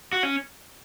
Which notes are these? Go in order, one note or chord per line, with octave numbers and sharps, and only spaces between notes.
F#4
C#4